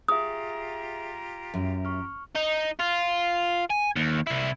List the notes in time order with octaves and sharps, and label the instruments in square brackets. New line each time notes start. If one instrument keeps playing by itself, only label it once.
[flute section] F4 G4 A#5 [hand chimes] G#4 E5 [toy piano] D#6
[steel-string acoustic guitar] F#2 [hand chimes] E5
[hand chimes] C#6 F6
[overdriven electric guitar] D#4
F4
G#5
D#2
C3 E4